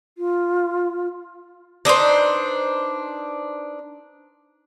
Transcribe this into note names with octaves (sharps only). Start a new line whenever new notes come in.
F4
D4 D#4 B4 C5